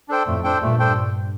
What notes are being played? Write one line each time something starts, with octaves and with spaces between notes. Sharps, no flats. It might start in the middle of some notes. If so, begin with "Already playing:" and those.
D4 A4 C5 G5
F2 A2 A3
D4 A4 C5 G5
G2 A#2 A3
D4 A4 C5 G5